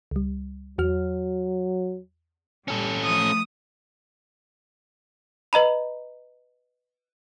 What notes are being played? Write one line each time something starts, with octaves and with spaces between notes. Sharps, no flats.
C#2 G3
E2 F#3 F#4 F6
G3 C#4 A4
F3 A3 D#6
B4 D#5 A#5 B5